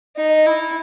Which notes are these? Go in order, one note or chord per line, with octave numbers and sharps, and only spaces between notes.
D#4
E4